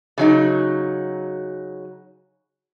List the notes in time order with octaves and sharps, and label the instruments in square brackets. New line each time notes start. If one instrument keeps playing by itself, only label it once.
[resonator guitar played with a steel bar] C#3 F#3 D#4